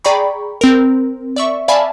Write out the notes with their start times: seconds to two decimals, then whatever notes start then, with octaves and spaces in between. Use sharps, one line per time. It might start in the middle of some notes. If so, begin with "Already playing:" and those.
0.04 G#4 D5 G5 A#5 B5 C#6
0.61 C4 A#4
1.36 D5 E5 C#6
1.68 D5 E5 F5 G#5 A5 B5